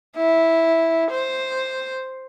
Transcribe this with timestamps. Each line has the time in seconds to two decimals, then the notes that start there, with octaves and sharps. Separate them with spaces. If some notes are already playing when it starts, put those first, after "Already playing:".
0.17 E4
1.11 C5